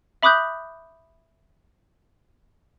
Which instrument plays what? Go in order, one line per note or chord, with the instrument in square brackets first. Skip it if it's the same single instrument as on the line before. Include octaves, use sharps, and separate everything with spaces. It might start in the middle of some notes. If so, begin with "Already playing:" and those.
[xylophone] E5 B5 D6 D#6 F#6 G6